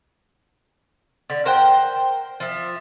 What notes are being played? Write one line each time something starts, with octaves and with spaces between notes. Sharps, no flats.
D3
A#4 C5 F#5 G5
F3 E5